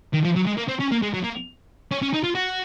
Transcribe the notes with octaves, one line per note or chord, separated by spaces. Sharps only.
D#3
F3
F#3
G#3
A#3
C4
C#4
A#3
G#3
F#3
A#3
C#4
C#4
D#4
F4
F#4